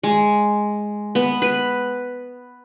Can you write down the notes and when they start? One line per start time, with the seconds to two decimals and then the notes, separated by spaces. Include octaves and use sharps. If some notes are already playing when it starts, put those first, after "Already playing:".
0.03 G#3
1.15 B3
1.42 B4